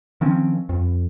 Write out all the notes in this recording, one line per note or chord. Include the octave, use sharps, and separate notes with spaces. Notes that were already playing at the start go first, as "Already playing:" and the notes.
D#3 F3 C4 C#4
F2